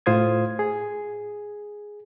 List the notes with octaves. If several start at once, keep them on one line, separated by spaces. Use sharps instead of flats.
A2 F4 C5 D#6 G#6
G#4